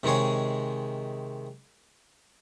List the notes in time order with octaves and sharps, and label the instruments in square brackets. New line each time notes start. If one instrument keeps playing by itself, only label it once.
[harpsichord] C3 D#3 G#3 G#4 C#5